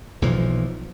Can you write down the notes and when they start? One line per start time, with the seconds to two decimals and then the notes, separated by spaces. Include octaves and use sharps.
0.22 B1 A#2 E3 F3